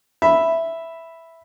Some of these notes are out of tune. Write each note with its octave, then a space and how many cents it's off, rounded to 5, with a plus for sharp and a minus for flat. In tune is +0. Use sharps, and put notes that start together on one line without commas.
E5 +0 B5 +0